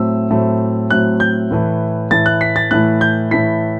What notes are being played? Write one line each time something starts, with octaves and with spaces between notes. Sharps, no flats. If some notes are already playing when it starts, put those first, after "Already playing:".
Already playing: A2 F#3 A3 C4 E6
A2 F#3 A3 C4
A2 F#3 A3 C4 F#6
G6
A2 E3 A3 E4
A2 E3 A3 E4 A6
F#6
B6
A6
A2 E3 A3 E4 F#6
G6
A2 E3 A3 E4 B6